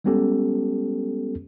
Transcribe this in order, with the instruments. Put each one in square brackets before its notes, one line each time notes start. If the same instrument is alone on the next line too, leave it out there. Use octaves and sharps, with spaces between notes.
[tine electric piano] G3 G#3 B3 C#4 G4 A4